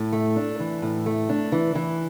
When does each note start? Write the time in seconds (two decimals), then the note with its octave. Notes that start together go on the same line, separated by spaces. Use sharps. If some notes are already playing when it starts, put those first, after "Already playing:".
Already playing: A2
0.13 A3
0.36 D4
0.60 E3
0.82 A2
1.06 A3
1.29 D4
1.52 E3
1.75 E3